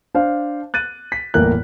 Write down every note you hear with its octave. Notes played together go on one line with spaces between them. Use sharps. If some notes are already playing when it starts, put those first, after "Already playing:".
D4 C5 F5
F#6 A6 D#7
B6
G1 E2 A2 A#3 A#4 F#6